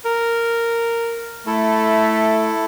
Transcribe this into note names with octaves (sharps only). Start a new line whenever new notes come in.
A#4
A3 E4 A4